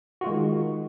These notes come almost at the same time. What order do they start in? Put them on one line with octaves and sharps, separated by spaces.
F#4 F4 G#3 D#3